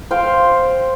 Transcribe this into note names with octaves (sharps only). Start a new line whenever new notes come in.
C5 F5 G5